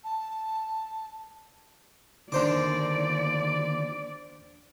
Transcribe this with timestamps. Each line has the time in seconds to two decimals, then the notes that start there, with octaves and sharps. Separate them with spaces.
0.04 A5
2.32 D3 D#3 A#3 D4 C5 D5 D6